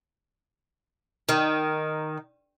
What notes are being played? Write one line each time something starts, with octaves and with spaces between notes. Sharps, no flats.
D#3